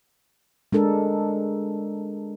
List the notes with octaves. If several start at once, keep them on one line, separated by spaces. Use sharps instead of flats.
G#3 D4 A4 A#4